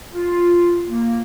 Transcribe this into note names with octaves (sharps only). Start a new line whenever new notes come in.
F4
A#3